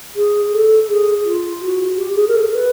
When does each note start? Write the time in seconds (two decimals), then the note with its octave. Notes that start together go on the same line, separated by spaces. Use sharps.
0.15 G#4
0.53 A4
0.89 G#4
1.24 F4
1.61 F#4
1.97 G4
2.16 G#4
2.28 A#4
2.34 A4
2.52 B4